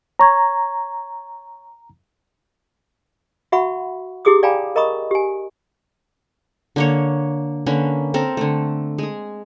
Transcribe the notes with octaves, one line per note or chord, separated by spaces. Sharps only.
C#5 A#5 C#6 G#6
F#4 E5 F#5 B5 C#6
E4 G4 G#4 D6 D#6
D5 F5 G5 G#5 A#5 B5
A#4 D#5 A#5 B5 C#6 D#6
G4 G#5
D3 A#3 C#5
D3 A#3 C#4 B4
C4 A4 A#4
D3 A3
G#3 G#4